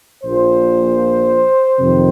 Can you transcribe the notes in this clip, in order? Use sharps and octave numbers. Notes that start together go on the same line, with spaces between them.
A#1 A#2 F3 C5
F2 C3 D#3